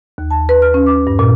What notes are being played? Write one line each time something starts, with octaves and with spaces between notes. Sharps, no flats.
D#2
A5
B4
F6
C#4
D6
G2
A#2